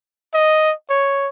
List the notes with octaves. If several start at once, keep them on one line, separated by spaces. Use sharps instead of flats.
D#5
C#5